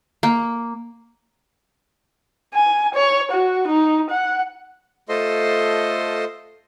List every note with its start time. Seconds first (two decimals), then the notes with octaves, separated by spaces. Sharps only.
0.23 A#3
2.54 G#5
2.95 C#5
3.32 F#4
3.68 D#4
4.11 F#5
5.09 A3 F4 A4 C5 D#5 C6